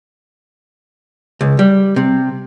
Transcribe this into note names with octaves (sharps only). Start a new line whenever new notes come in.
C#2
G3
C3